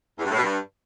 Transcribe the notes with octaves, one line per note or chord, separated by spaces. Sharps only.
E2
G2
A2
B2
G2